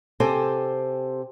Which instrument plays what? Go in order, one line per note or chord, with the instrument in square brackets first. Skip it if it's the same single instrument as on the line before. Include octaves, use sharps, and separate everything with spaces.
[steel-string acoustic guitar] C3 C4 G4 A4 C5 G#5